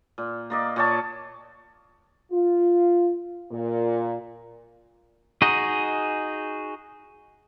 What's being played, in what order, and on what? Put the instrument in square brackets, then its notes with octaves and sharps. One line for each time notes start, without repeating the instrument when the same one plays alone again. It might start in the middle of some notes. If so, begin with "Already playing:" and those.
[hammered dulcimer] A#2
A#3 D5 D#5
A#2 C#5 A5
[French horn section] F4
A#2
[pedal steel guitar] D#4 F#4 G#4 D#5